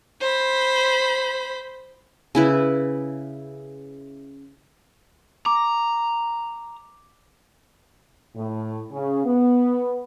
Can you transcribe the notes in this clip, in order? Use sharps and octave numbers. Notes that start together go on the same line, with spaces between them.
C5 B5
C#3 E4 B4
A#5 D6
A2
C#3
B3